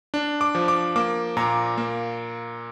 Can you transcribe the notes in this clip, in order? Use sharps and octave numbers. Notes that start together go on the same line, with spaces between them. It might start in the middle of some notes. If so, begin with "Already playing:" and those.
D4
D6
F3
D6
A#3 D6
A#2 A#5
A#3